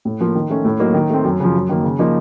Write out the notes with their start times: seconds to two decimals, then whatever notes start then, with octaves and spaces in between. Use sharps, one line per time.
0.05 A2
0.20 F3 A#3
0.35 D#3
0.50 A3 C#4
0.65 A2
0.80 F#3 A#3 D#4
0.94 D#3
1.10 A3 C4
1.24 F#2
1.40 C#3 F3
1.54 F#2
1.69 D#3 A#3
1.84 C#3
1.99 F3 A#3 D#4